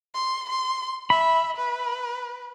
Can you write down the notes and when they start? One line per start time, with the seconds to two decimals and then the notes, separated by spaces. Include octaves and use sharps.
0.15 C6
0.49 C6
1.10 E5 B5
1.57 B4